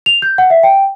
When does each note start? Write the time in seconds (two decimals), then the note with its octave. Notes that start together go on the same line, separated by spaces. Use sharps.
0.06 F7
0.22 G6
0.38 F#5
0.50 E5
0.63 G5